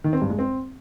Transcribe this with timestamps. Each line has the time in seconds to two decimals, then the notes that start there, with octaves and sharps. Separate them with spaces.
0.04 D#3
0.13 C4
0.21 G2
0.30 G#3
0.39 C4